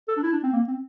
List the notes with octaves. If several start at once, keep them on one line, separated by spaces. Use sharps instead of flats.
A4
D4
E4
D4
C4
A#3
C4